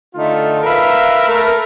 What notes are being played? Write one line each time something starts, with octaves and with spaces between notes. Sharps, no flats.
D3 A3 D#4 F4
A#4 B4 E5 F5 A#5
A3 A#4